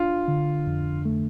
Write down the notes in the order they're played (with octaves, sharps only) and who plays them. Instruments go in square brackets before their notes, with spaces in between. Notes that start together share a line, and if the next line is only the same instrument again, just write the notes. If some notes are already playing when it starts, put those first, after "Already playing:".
Already playing: [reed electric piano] D4 [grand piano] F4
[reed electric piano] D3
F2
A3